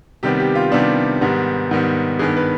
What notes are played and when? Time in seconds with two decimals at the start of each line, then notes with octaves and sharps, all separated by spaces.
0.23 C3 D#3 G3 B3 G4
0.40 G4
0.55 F4
0.72 C3 D#3 G3 B3 D4
1.21 G#2 D#3 G3 B3
1.71 G#2 D#3 G3 B3
2.19 G2 D#3 B3 G#4
2.37 B4